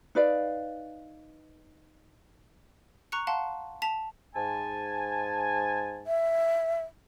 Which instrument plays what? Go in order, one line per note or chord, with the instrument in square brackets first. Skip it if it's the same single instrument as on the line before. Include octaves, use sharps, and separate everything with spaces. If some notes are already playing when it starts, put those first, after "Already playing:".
[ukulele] D#4 B4 D5 F5
[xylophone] A#5 C#6 F#6 C#7
F5 F#5 A5 C6
A5 B6 F7
[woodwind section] G#2 G#5 A5
[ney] E5